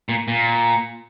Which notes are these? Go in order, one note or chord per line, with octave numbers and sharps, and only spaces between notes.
A#2
A#2